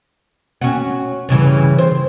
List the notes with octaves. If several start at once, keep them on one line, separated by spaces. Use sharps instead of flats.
C#4 F#4
G2 C#3 E3
C5